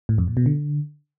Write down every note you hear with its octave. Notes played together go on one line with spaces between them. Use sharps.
A2
F2
A#2
B2
D3